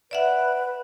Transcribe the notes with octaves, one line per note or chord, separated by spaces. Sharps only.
B4 D5 E5 F#5